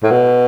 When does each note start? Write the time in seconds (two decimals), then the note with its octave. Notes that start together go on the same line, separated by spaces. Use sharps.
0.03 A2
0.11 B2